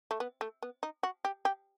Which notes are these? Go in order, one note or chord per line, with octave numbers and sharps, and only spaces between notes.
A3
B3
A3
B3
D#4
F#4
G4
G4